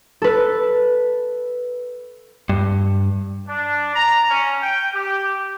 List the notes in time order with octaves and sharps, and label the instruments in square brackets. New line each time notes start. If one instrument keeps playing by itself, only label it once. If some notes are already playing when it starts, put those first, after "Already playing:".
[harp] A4 B4
[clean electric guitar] G2
[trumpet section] D4
A#5
C#4
G5
G4